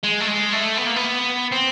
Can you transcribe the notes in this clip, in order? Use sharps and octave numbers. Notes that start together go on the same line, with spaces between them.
G#3
A3
G#3
A3
B3
A#3
B3
C4